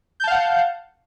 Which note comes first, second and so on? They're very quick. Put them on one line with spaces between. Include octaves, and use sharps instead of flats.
G6 A5 F5 F#5